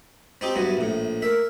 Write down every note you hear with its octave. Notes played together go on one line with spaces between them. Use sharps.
C4 D#4 G4
G2 F#3 B3 E5
A#1 A2
A#4 E5